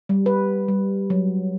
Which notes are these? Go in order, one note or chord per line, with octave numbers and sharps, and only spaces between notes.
G3
B4
G3
F#3